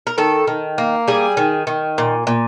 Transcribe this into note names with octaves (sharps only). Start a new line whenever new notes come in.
A#4
D#3 A4
D#3
A#3
G3 G#4
D#3
D#3
A#2
A#2